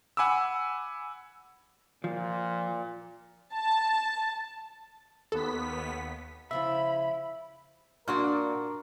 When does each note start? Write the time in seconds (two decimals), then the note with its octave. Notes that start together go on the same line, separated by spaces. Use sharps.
0.17 F#5 G#5 B5 D6 E6
2.04 A#2 F3
3.54 A5
5.32 D#2 B3 A4 B6
6.51 C#3 F3 E4 E5 B5
8.08 A#2 D4 F#4 A#4 D5 C6 C#6 F6